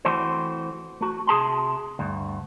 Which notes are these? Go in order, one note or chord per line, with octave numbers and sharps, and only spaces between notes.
E3 A3 C4 F#4 C5
A3 F#4
C3 G#4 A5 C6
D2 G2